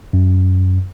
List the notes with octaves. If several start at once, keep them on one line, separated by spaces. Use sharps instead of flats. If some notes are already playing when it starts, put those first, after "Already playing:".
F#2